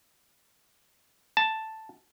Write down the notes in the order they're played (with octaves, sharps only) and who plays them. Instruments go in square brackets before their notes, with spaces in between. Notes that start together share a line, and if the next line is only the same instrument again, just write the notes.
[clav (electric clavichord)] A5